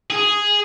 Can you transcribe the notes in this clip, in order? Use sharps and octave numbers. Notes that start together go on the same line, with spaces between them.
G#4